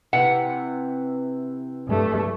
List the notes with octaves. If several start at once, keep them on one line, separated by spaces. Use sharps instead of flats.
C3 E3 F#5
G2 A3